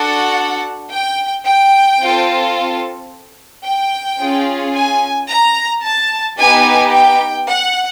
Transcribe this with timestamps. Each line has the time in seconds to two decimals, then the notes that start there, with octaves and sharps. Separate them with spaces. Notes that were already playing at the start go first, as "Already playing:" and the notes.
Already playing: D4 F#4 A4 F#5
0.91 G5
1.45 G5
2.00 C4 F4 A4
3.65 G5
4.19 C#4 F4 G#4
4.74 G#5
5.29 A#5
5.84 A5
6.38 B3 D#4 G4 G#5
6.93 G5
7.48 F#5